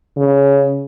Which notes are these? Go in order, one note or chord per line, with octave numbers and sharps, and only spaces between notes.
C#3